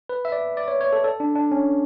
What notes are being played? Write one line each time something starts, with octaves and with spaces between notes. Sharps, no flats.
B4
E5
D5
D5
C#5
C#5
A4
A4
D4
D4
C#4